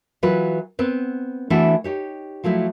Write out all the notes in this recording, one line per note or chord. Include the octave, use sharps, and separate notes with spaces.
E3 F#3 F4 B4
B3 C4 B4
E3 A3 B3 D4 E4 F#4
D#4 G4 C#5
F3 F#3 A3 E4